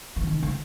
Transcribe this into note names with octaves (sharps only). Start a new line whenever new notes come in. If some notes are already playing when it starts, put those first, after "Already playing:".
E3
D#3
D3